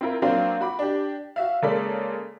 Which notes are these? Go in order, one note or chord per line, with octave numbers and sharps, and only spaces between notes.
C4 E4 F4 A#4
F#3 A#3 C4 D4 C5 F5
F#4 B5 D6
D4 G4
F#4 E5 F5
C#3 G#3 A#3 A4 D5 B6